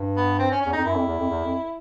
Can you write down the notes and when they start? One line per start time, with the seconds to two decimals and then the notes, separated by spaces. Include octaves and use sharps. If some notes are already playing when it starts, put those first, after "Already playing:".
Already playing: G2
0.17 B3
0.39 C4
0.51 C#4
0.61 E2 C#4
0.73 F2 D#4
0.84 F#2 E4
0.95 F2
1.07 E2
1.18 F2
1.30 E2
1.44 F2